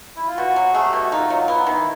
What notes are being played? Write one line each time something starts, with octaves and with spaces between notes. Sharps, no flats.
E4
F4
B2 F#4
F#3
A3 G#4
G4
B2
F#4
D#4 F4
F#3
B3 E4
D#3